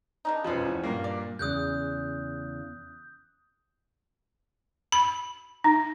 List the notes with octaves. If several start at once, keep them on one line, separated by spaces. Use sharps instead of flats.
C#3 D4 D#4
E1 F2 F3 G#3 C4 C#4 B4
E2
G2 A#2 A#3
D5
E2 C#3 D#6 F#6 G6
B5
D#4